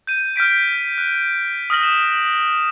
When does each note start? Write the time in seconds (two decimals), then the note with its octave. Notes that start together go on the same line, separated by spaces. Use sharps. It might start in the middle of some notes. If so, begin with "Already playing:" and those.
0.07 G6 D#7
0.36 F6 G6 B6 D7
0.98 F#6
1.70 D#6 F6 A#6 F#7
1.83 E7